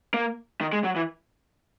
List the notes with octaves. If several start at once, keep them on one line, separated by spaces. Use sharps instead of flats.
A#3
D#3
G#3
F#3
E3